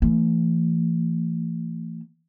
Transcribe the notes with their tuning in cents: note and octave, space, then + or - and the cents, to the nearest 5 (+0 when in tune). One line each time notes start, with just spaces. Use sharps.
E3 +25 A3 +45